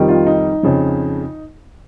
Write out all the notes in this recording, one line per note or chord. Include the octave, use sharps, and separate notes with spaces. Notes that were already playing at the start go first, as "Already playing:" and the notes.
Already playing: F2 D#3 G3
F4
D#4
F2 C#3 F3